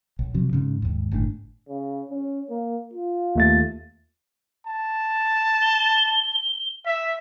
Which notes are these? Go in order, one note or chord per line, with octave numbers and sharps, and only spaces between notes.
B1
F2 C3 F#3
G#2 C#3
D#2 G#2
G1 A2 D4
C#3
C#4
A#3
F4
D#2 A3 A6
A5
G7
E5 B6